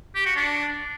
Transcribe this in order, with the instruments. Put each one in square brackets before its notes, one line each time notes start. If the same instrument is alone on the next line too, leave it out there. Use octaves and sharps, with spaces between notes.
[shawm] G4
F#4
D4